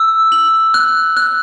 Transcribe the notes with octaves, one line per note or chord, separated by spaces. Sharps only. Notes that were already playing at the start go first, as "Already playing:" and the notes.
Already playing: E6
F#7
F#6
F#6